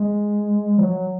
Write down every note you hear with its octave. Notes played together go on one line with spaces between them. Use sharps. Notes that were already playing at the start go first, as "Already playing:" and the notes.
Already playing: G#3
F3
F#3